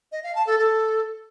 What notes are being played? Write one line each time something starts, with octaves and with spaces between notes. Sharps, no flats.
D#5
F5
A5
A4
A4